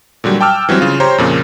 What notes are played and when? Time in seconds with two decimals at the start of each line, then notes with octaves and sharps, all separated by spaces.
0.24 A#2 D3 F#3 G3
0.41 G5 A5 D6 E6 F6
0.69 E3 F#3 G3 C4
0.81 C#3 F4
1.00 G4 C5 C#5 A#5 C6
1.18 F2 A#2 C#3